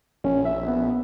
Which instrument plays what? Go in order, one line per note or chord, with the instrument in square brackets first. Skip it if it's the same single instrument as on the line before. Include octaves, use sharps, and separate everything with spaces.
[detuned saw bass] A#1 [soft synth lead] C#4
[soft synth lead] E5
B3